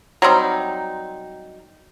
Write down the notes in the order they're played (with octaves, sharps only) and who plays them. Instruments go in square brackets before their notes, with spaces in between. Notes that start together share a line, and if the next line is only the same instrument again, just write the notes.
[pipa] F#3 G3 C4 D#4